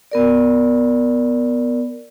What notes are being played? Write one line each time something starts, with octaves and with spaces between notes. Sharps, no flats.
B3 A#4 D5